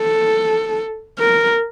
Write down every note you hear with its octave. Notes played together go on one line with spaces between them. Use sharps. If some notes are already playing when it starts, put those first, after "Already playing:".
Already playing: A4
A#4